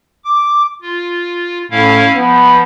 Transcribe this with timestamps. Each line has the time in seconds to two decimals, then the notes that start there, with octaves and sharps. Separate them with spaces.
0.24 D6
0.82 F4
1.71 A2 C#4 E4 F5
2.15 F3 B3